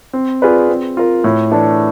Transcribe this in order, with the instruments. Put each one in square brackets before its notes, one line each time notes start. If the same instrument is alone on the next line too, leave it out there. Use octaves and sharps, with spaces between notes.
[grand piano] C4
F4 G#4 B4 D5
C4
F4 A#4
A2
E3 A3 D4